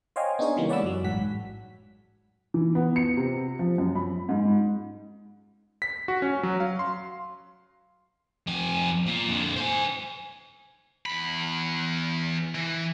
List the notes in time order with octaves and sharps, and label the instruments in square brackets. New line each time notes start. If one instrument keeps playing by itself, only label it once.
[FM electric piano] C5 C#5 D#5 F5 G5 G#5
B3 D4 D#4 G#4 C#5
C#3 E3 G3 G#3 A#3
C#5 D5 F#5 B5 D6 E6
F#2 F#3
A1 G#2 F#5 B6
[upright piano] E3
B3
C#7
C3
F3
F#2
B5
G#2
[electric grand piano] B6
F#4
C#4
F#3
F5
C6
[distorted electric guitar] F2 G#5
A#2
F2 D3
C5 G#5
E2 B5
E3